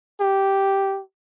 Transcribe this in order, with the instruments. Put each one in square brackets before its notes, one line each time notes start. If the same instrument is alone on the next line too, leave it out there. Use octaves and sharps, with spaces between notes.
[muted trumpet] G4